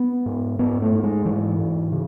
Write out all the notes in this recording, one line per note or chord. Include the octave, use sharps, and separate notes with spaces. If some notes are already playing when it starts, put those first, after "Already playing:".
Already playing: B3
G#2
G#2 B3
A3
G#2
G#3
G#2 E3
G#2
C#3